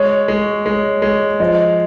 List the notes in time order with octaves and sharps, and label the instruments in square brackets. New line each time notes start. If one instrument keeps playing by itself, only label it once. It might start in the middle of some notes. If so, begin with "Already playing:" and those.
Already playing: [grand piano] G#3 [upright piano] C#5
[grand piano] G#3
G#3
G#3
[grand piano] F3 [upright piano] D#5